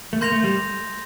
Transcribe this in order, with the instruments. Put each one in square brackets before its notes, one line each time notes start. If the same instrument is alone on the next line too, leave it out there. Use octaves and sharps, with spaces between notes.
[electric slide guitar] A3
[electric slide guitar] A#3 [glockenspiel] C6 G6 A#6 F7
[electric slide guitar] A3
G3